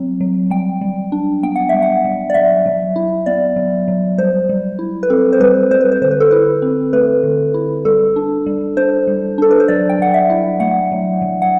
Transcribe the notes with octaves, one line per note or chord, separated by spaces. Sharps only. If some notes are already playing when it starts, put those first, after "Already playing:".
Already playing: F#3 C4
F#3
G3 G5
G3
D4
B3 G5
F#5
G3 E5
F#5
G3
D5
F#3 E5
F#3
E4
B3 D5
F#3
F#3
G3 C5
G3
E4
B4
C4 A4
C5
G3 B4
G3 C5
B4
C5
D3 C5
B4
A4
E4 B4
C4
A3 B4
D3
E4
G3 A4
D4
G3
D4 C5
G3
D4 A4
B4
C5
F#3 D5
G5
F#3 F#5
E5
E4
A3 F#5
F#3
F#3
F#5